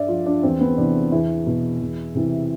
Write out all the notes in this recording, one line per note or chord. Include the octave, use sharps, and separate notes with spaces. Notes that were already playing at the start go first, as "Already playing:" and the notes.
Already playing: G2 D5 E5
F3 F4
D4
E2 C4
B3
C3 E3 D4
E2 E4
B2
E2
C3 E3